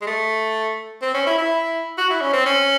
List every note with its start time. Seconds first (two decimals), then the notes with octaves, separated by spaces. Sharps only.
0.01 G#3
0.07 A3
1.02 C4
1.14 C#4
1.26 E4
1.38 E4
1.98 F#4
2.10 E4
2.21 C#4
2.33 C4
2.46 C#4